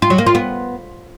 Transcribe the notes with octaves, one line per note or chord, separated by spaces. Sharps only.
F4
F#3
A#3
F4
B3